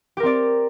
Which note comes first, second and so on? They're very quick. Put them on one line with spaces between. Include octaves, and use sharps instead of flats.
G4 A#4 C4 D5